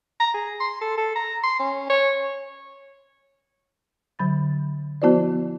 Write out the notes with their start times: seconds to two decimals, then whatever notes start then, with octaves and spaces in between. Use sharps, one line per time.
0.20 A#5
0.34 G#4
0.60 C6
0.81 A4
0.98 A4
1.16 A#5
1.43 C6
1.60 C#4
1.90 C#5
4.19 D3 F#3 B5 A6
5.02 F3 B3 E4 F#4 C5 D5